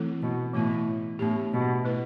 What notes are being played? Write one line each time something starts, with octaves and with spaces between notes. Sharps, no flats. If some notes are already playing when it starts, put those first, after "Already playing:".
Already playing: E3 A3 C4 E4 A4
B2
A2 E3 B3 E4
A2 B3 D4 G4
B2
A3 E4 B4